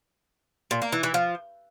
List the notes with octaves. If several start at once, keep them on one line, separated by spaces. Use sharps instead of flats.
A#2
A#3
E3
E3
F3